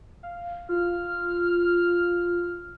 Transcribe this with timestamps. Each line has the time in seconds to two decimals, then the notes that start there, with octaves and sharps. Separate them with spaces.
0.23 F5
0.69 F4 F6